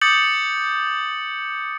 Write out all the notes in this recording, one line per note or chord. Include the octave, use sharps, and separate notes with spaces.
D6 D#6 G6 A6 C#7 F#7